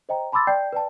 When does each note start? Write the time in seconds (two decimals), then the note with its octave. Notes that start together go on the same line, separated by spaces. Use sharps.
0.09 C5 D#5 G5 A#5
0.32 A5 B5 C6 D6 E6 A6
0.47 D5 G5 A5 G6 C7
0.73 B4 D5 G5 A5